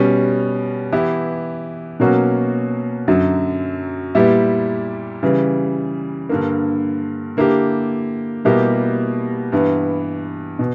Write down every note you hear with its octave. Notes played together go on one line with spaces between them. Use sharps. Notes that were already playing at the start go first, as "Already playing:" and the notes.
Already playing: B2 G3 C#4
E3 B3 E4 G4
B2 F#3 A#3 C#4 F#4
F#2 D3 F#3
A#2 G3 B3 E4 G4
C#3 E3 G3
G2 D3 A#3
D3 A#3 E4 G4
B2 G3 A#3 E4 G4
G2 E3 B3
B2